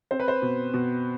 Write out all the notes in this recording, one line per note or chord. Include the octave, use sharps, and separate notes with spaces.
C4 C5
B4
C5
B2
B2